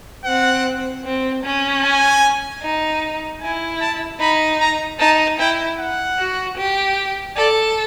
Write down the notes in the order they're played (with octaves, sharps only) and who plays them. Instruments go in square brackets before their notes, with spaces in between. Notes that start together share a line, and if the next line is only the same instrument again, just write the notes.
[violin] C4 [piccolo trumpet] F#5
[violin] C4
C#4
[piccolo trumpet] G#5
[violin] D#4
[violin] E4 [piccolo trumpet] G#5
[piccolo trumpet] A5
[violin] D#4 [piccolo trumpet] B5
[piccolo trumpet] A#5
[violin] D#4 [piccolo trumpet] A5
[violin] E4 [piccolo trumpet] G5
[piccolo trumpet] F#5
[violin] F#4
G4
[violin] A4 [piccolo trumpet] D5